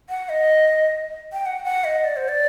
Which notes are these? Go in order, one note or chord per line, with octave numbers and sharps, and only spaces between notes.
F#5
D#5
G5
F#5
F#5
D#5
D5
C5
D5